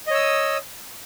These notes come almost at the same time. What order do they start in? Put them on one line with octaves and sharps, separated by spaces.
D#5 C#5 E6 D#6